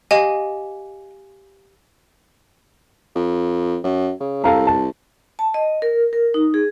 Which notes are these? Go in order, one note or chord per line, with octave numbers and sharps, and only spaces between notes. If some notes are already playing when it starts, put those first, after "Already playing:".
G4 D#5 F5 G#5
F2
F#2
C#3
C2 A4 F5 A#5
A5
A5
D#5
A#4
A#4
D#4
G#4